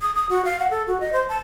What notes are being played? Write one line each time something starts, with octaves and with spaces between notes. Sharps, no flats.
D#6
D#6
F#4
F5
F#5
A4
F#4
D#5
C5
A5